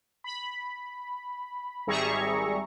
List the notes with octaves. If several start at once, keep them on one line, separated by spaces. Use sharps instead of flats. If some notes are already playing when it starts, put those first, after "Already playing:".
B5
G#1 G3 G#4 E5 A#5 C#6